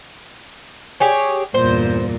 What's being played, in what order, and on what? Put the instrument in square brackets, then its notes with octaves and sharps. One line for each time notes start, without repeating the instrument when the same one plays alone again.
[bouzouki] G4 G#4 C#5
[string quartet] E2 G2 A#2 [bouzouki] C5